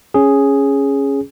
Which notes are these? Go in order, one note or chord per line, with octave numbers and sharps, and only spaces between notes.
C#4 G#4